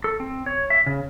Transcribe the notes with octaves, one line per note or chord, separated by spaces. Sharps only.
A4
C4
C#5
E5
C#3